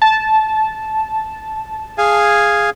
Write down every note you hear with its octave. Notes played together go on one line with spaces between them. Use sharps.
A5
G#4 F5 G#5